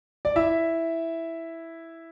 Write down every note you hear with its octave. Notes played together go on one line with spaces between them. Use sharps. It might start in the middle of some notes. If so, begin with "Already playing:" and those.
D5
E4 E5